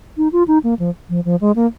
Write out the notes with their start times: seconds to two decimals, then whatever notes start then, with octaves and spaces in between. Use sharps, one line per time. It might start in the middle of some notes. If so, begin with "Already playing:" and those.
0.17 D#4
0.32 F4
0.48 D#4
0.64 A#3
0.79 F3
1.09 F3
1.25 F3
1.41 G#3
1.56 A#3